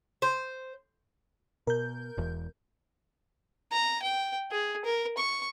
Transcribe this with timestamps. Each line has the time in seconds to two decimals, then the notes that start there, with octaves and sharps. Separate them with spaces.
0.22 C5
1.67 B2 A#4 G6
2.18 E1 E2
3.72 A#5
4.02 G5
4.51 G#4
4.85 A#4
5.17 C#6